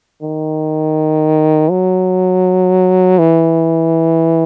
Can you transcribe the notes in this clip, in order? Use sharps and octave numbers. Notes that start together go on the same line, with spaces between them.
D#3
F#3
E3